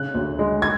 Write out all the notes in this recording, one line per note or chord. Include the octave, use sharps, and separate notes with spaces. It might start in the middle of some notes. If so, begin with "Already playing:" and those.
Already playing: C#3 F#6
D2
G#3
G#6